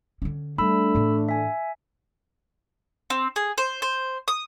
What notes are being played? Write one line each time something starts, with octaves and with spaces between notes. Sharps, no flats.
D3 C#4
G3 A3 D4 B5 E6
A2 E3
E5 G#5
C4
G#4
C5
C5
D#6